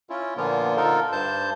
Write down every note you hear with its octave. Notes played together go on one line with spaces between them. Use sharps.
C#4 E4 F4
A#2 D3 F3 A#3 B3 F4
D3 D#4 F4 A4 A#4
G2 C5 A5 G6